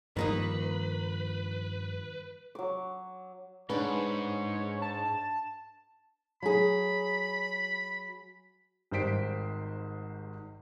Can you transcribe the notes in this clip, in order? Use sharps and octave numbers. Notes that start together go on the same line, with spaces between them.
G2 D#3 F3 A#3 D#4 B4
F#3 D6
G#2 D4 B4 C#5
A5
F#3 G#4 B5
G#1 G#2 G3 C5 B6 D7